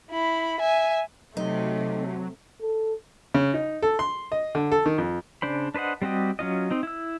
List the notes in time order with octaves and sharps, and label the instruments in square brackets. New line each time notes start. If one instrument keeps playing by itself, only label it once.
[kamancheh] E4 B5
E5 G#5
[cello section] C3 [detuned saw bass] F#3 [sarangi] A3 [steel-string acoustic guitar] D#4
[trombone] A4
[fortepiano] C#3
D#4
A4
C6
D#5
D3
A4
D#3
F2
[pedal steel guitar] C#3 D4 C5 B5
D4 B4 C5 D#5 F#5
G3 C4 F#4 G4 D#5
F#3 C#4 F4 D#5
C4 D#4
E4 E6